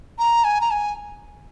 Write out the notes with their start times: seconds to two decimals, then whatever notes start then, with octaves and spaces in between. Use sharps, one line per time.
0.19 A#5
0.44 G#5
0.61 A#5
0.71 G#5